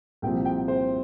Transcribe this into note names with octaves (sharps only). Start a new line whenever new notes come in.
C2 A#2 F3 G5
G5
C5